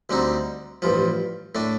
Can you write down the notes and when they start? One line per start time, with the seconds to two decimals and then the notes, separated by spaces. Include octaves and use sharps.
0.10 D2 D3 G3 C4 D#4
0.82 A1 G2 F3
1.55 A2 A3 D4